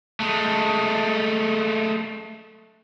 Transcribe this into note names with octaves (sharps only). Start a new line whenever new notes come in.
G#3 A3